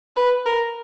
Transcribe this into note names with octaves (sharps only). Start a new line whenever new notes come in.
B4
A#4